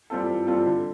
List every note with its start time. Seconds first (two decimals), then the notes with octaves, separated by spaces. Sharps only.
0.10 G3 C4 F4 A4
0.28 E3
0.47 G3 C4 F4 A4
0.66 D3